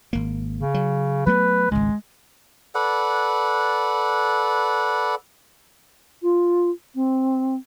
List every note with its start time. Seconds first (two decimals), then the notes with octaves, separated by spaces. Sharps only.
0.13 G#1 A#3
0.59 C#3
0.74 F#3
1.26 F#3 A3 B3 B4
1.71 G#1 C#2 G#3
2.75 A4 B4 D5 F#5
6.22 F4
6.95 C4